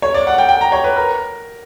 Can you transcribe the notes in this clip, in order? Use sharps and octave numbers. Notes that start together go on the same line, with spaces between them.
C#5
D5
F#5
G5
G5
A#5
C#5
B4
A#4